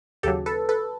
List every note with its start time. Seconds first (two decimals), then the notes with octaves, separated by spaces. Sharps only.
0.23 D#2 C#3 F#3 G4 A4
0.46 A4 B4
0.69 A4 B4